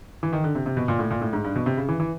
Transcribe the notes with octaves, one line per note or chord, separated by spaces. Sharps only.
E3
D#3
D3
C3
C3
B2
A#2
A2
A#2
A2
G#2
G2
B2
C3
C#3
E3
E3